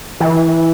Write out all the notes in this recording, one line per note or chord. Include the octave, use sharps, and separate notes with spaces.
E3